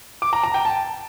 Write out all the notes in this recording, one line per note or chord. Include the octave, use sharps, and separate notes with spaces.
D6
A#5
A#5
G5
A5